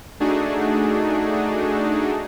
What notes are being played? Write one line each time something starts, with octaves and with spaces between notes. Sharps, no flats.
A3 D4 D#4 F#4 G#4